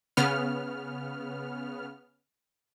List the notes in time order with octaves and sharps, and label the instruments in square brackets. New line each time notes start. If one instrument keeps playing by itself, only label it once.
[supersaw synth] C#3 B3 F6